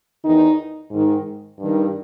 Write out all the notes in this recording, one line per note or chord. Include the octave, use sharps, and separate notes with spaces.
E2 D#3 D#4
G#2 D#3
G2 D#3